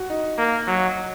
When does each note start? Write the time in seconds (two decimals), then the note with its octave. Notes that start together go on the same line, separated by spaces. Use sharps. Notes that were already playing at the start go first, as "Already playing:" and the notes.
Already playing: F#4
0.10 D#4
0.38 A#3
0.67 F#3